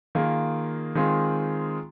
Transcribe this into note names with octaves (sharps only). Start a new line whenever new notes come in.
D#3 A#3 F4 G#4
D#3 G#3 C4 F4 G#4